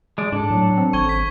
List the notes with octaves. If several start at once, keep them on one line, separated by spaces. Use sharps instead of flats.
G#3 D5
G#2 D4 A4
A2 F#3
C4
G#1 C#6 G#6 G7
B6